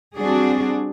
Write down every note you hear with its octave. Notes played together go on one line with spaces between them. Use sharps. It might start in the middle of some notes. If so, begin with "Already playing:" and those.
G3 C4 D4 F#4 G#4